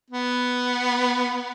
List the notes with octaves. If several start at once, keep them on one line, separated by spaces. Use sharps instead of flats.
B3